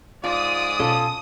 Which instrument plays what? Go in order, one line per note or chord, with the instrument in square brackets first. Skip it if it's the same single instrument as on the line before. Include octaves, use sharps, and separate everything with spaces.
[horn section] G#2 D5 [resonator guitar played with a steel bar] F4 [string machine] D#6
[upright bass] B2 [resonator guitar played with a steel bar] C#4 F4 A4